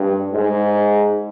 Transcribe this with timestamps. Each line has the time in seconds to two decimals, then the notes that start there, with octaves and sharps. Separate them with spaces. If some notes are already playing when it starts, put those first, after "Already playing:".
Already playing: G2
0.32 G#2